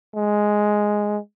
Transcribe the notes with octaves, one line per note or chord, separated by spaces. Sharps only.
G#3